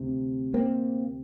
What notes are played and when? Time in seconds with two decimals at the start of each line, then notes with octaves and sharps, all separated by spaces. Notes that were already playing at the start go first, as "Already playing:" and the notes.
Already playing: D2 C3
0.54 A#3 C4